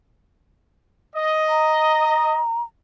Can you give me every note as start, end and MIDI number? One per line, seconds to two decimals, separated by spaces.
1.14 2.38 75
1.49 2.62 82